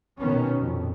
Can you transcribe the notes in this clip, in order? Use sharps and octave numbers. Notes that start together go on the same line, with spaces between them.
B2 D#3 B3 C#4
F2 A#2